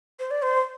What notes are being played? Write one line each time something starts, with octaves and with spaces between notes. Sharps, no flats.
C5
D5
C5